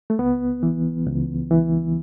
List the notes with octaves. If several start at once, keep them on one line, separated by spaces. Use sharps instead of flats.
A3
C#2 B3
E3
C#2
E3